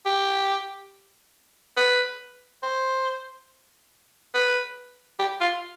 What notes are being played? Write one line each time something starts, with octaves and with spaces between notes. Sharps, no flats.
G4
B4
C5
B4
G4
F4